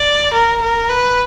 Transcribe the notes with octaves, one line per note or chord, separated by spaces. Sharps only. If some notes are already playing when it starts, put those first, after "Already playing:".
Already playing: D5
A#4
A#4
B4